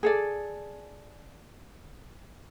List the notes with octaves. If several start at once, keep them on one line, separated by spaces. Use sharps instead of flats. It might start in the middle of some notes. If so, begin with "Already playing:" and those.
G#4 A4 D5